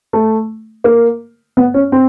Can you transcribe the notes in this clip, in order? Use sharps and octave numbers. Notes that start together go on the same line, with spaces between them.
A3
A#3
B3
C#4
C4